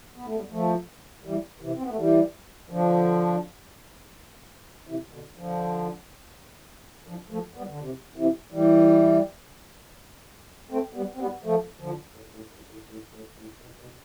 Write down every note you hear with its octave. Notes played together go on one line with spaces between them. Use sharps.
B3
A3
G3 B3
F3 A3
E3 G3
C3 E3
C4
B3
A3
E3 G3
D3 F3
C3 E3
B2 D3
D3 F3
D3 F3
F3 A3
G3 B3
D3
C3
C3 E3
E3 G3
A3 C4
G3 B3
C4
G3 B3
F3 A3
D3 F3
A2
A2
G2
A2
A2
A2
A2
B2
B2